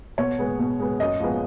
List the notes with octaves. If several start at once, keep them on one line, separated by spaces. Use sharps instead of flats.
B2 C#5
G#3 B3
B2
G#3 B3
F#2 D#5
F3 G#3 B3